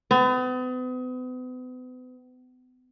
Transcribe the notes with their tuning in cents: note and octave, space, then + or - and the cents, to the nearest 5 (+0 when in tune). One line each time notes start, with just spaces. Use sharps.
B3 +40